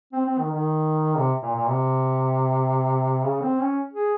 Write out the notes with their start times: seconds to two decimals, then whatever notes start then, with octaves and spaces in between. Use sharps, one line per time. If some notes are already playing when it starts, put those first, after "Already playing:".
0.13 C4
0.26 C4
0.38 D#3
0.51 D#3
1.17 C3
1.42 A#2
1.55 A#2
1.68 C3
3.25 C#3
3.41 C4
3.59 C#4
3.93 G#4